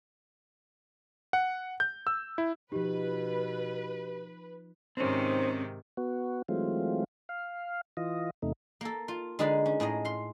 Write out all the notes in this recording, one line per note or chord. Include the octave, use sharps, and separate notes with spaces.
F#5
G6
E6
E4
B2 F3 D#4 G4 B4
G#2 C3 D#3 C4 C#4 D#4 C5
B3 F#4
E3 F#3 G#3 A3 C4 F4
F5
E3 F4 D#5
E2 C3 A3 D#4
A#3 A4
F4
D3 G#3 D#4 G#4 B4 D5
C#4
A2 G#4 D#5 A#5
F5 C6